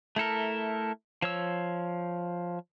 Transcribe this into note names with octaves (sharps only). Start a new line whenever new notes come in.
A3 E4 A4 A#4
F3 C#5 E6